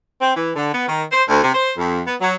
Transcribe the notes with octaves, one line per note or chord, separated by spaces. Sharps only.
C4
E3
D3
B3
D#3
C5
D2
C3
C5
F2
B3
F#3